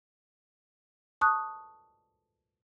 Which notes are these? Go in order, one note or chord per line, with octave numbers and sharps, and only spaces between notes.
A5 C#6 D#6 F#6